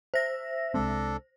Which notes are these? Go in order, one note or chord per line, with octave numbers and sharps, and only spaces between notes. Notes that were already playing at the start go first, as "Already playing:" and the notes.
C5 E5 A#6
C2 G#3 C4 D4 A4